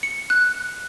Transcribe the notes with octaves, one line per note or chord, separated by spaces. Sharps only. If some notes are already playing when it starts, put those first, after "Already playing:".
C#7
F#6